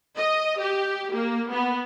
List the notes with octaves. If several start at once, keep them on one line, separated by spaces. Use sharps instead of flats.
D#5
G4
A#3
B3